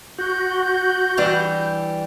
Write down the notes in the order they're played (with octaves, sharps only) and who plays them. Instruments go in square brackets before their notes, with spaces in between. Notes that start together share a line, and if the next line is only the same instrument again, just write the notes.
[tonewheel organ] F#4 [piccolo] G6
[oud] E3 G3 D4